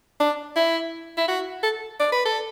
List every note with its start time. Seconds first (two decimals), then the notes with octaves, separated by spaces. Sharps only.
0.20 D4
0.56 E4
1.17 E4
1.28 F#4
1.63 A4
2.00 D5
2.12 B4
2.25 A4